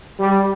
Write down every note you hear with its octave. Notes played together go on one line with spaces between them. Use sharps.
G3